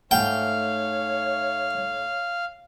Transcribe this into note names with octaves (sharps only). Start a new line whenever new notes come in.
G#2 A3 C#5 F5 G5